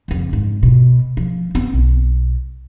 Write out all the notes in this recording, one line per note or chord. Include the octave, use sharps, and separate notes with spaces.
F#1 F2
G#2
B2
F3
B3 C4
B1